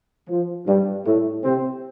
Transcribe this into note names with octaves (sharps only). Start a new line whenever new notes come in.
F3
G2 G3
A2 A3
C3 C4